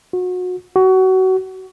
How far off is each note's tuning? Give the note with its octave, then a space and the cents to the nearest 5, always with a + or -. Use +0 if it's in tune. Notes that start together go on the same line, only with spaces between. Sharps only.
F#4 -30
F#4 +25